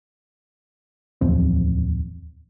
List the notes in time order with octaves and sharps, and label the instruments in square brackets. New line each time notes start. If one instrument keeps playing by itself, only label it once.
[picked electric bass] D1 E2 F3 C4